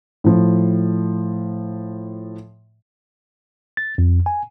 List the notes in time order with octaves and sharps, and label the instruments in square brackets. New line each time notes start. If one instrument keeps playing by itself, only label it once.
[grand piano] A2 F3
[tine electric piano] A6
F2
G#5